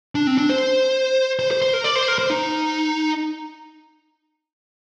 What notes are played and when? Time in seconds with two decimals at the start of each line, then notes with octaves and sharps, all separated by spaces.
0.15 D4
0.27 C4
0.38 D4
0.50 C5
1.39 C5
1.51 C5
1.62 C5
1.74 A#4
1.84 D5
1.96 C5
2.08 A#4
2.18 C5
2.30 D#4